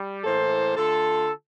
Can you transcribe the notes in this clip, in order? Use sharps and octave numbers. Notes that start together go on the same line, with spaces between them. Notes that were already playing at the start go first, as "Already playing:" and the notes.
Already playing: G3
A2 E3 A#3 A4 C5
D3 A3 F4 A4